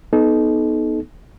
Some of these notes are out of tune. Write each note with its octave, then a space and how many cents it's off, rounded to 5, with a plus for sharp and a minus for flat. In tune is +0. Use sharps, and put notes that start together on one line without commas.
B3 +0 D#4 +0 A4 -35